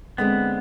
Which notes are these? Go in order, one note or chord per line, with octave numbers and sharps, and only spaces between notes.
D3 G#3 B3 C4